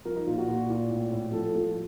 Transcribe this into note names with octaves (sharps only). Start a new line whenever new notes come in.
F3 A#4
D#4
A#2 F4
F#4
A#2
A#2
A2
A2
F3 A4
F3